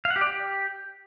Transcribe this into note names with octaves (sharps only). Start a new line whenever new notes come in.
F5
F#5
G4
D5
G4